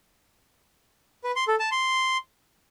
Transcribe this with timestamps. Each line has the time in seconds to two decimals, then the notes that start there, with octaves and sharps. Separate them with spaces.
1.24 B4
1.36 C6
1.48 A4
1.60 A5
1.71 C6